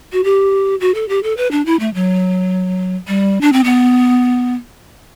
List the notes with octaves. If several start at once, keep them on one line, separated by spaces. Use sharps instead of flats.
F#4
G4
F#4
A4
G4
A4
B4
D4
E4
A3
F#3
G3
D4
C4
B3